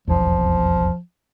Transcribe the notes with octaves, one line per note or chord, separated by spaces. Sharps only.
F1 B1 E2 F3